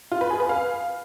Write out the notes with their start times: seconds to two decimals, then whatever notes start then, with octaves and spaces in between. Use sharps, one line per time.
0.11 F4
0.21 B4
0.30 G#4
0.40 B4
0.49 F5